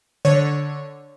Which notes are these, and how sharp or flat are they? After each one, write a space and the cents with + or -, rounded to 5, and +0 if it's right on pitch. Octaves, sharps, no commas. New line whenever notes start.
D3 +0 C#5 +0